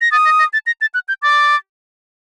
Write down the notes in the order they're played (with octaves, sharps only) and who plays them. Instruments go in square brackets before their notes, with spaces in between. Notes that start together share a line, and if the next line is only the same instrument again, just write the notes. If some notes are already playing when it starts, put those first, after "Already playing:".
[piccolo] A#6
[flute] D#6 [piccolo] A6
[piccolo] A#6
A#6
A6
A#6
A6
F#6
G6
[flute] D6 [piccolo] A6